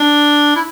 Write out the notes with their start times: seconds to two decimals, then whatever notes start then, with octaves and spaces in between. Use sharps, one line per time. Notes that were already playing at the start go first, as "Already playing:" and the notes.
Already playing: D4
0.56 E4